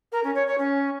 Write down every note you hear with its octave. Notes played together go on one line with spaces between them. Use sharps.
A#4
C#4
C#5
C#5
C#4